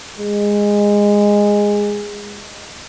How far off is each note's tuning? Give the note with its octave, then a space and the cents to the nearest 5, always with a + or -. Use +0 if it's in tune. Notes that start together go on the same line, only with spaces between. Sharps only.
G#3 -15